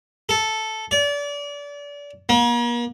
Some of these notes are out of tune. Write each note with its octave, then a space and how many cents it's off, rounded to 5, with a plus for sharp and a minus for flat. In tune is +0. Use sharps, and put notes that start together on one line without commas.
A4 -5
D5 -30
A#3 +40